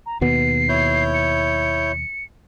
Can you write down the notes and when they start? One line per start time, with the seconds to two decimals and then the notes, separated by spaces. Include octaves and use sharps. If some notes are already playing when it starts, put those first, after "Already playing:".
0.06 A#5
0.21 D#2 B2 B3 C7
0.69 E4 C#5 G6
1.14 C#7